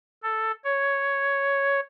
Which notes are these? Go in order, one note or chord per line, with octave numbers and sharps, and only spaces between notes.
A4
C#5